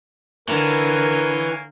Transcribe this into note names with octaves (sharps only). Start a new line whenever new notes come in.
D3 E3 A#3 A#4 C#5 G#5